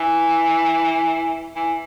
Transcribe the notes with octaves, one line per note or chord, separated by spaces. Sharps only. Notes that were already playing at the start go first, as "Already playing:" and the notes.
Already playing: E3
E3